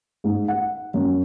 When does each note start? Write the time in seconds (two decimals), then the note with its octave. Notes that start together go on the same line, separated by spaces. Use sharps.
0.24 G#2
0.48 F#5
0.94 F#2